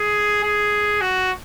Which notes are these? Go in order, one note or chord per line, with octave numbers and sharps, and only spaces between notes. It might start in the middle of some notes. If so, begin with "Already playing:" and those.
Already playing: G#4
G#4
F#4